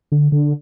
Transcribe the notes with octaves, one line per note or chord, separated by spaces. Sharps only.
D3
D3